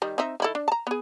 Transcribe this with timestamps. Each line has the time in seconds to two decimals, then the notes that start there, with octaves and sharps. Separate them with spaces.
0.02 D#3 G3
0.18 C4 D#4 E5
0.40 D#3 E4 A4
0.55 D4
0.68 A5 A#5
0.87 B3 G#4